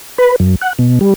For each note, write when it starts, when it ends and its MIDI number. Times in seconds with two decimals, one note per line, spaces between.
0.18 0.36 71
0.40 0.55 42
0.62 0.73 78
0.79 0.99 47
1.01 1.14 55